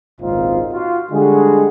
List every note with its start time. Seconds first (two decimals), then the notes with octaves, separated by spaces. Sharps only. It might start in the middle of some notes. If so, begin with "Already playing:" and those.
0.21 G#1 C#2 A#2 C4 D#4 F4
0.72 F4 F#4
1.12 D3 G3 G#3 F#4 G#4